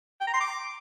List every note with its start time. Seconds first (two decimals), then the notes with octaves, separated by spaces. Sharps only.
0.21 G5
0.27 A#5
0.34 C6
0.40 D6